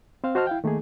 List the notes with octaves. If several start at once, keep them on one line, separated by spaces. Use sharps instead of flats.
C4 C5 F5
F#4 C5 D#5 A5 F6
E4 F5 G5
D#3 A3 A#3 D#4 G#4